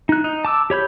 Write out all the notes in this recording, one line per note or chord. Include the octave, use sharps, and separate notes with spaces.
D#4 F#6
D#4
A5 D6 E6
G4 C#5 B5 G6